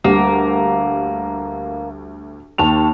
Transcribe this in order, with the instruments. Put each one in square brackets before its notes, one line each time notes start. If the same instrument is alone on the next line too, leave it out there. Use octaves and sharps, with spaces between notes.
[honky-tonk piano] D2 G3 [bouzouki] A#3
[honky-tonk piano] D#2 A5 F7